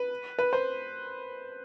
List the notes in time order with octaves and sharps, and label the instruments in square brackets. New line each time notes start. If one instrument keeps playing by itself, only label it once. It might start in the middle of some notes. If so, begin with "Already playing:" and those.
Already playing: [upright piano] B4
B4
C5